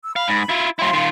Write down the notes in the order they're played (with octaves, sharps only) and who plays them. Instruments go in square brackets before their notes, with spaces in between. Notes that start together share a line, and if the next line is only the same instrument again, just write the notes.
[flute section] E6
[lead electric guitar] F5 [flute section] B5
[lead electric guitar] G#2
E4 F4
[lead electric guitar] F#3 E4 [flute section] F5 C6
[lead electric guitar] D#3 F4